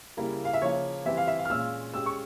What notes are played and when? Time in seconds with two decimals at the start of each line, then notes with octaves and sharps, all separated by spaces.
0.17 C#3 G3 A#3 E4 A#4
0.45 F5
0.53 E5
0.62 C#3 F3 A#3 F4 C#5
1.05 E3 G3 C4 E4 E5
1.17 F5
1.27 E5
1.39 F5
1.45 F6
1.50 A#2 G#3 C#4 F4 E6
1.94 G#3 C#4 G4 E6
2.06 C#6